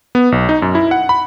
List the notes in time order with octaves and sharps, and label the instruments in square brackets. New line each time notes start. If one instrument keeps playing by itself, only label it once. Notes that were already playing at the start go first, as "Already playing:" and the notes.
[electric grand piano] B3
B1
D#4
F#2
E4
F#5
B5